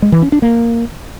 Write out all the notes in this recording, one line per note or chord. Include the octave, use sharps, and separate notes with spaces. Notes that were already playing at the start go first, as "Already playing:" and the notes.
G#3
E3
C#4
D4
A#3